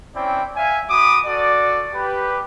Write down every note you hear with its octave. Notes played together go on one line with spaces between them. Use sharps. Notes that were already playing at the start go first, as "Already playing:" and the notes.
C4 C#4 E4 D5 G5
E5 F5 G#5
F#4 B5 D6 D#6
F#4 A4 D5
G4 B4